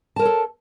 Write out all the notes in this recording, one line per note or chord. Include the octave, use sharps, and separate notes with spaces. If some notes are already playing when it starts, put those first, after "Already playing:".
A4 A#4 C#5 A5